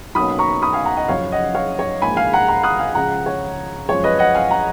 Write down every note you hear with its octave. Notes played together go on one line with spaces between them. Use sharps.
B1 B2 A#3 C#4 B5 D#6
A#5 C#6
B5 D#6
F5 G#5
F#5 A#5
D#5 F#5
F#1 F#2 F3 C#5 F5
D#5 F#5
C#5 F5
C#5
A#1 G#2 F3 A#3 G#5 B5
F5 G#5
F#5 A#5
F#5 A#5
D#6 F#6
F5 G#5
C#2 C#3 F3 F#5 A#5
C#5
F#2 F3 G#3 C#5
B4 D#5
D#5 F#5
F5 G#5
F#5 A#5